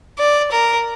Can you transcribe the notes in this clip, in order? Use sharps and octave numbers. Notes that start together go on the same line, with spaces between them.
D5
A#4